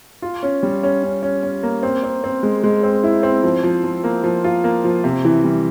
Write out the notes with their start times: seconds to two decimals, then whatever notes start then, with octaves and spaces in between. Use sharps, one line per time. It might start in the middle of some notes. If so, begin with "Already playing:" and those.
0.22 F4
0.43 C#4
0.63 G3
0.83 C#4
1.03 C#4
1.23 C#4
1.43 C#4
1.63 A#3
1.83 C4
2.04 C4
2.24 C4
2.43 G#3
2.64 G#3
2.83 C4
3.04 E4
3.23 C4
3.43 F3
3.63 F3
3.84 F3
4.04 A#3
4.24 F3
4.44 F4
4.64 A#3
4.84 F3
5.04 C3
5.25 E3
5.44 G3